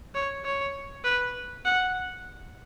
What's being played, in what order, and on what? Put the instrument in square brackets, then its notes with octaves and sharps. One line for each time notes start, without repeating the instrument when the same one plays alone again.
[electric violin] C#5
C#5
B4
F#5